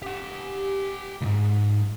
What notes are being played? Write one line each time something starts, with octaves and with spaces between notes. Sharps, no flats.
G4 F#5
C#2 G#2